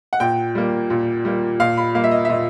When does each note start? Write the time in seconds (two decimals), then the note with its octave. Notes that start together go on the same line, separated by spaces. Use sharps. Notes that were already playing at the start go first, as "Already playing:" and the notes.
0.13 F#5
0.20 A#2 G5
0.55 G3 A#3
0.90 A#2
1.25 G3 A#3
1.60 A#2 F5
1.77 B5
1.95 G3 A#3 F5
2.04 E5
2.11 D#5
2.25 E5
2.29 A#2 D#5